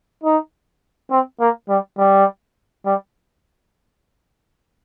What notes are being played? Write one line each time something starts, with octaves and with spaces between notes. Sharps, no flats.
D#4
C4
A#3
G3
G3
G3